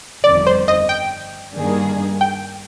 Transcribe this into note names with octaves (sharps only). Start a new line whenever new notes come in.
G1 F2 D#3 D5
C5
D#5
G5
G2 D#3 A#3 D4 G#4
G5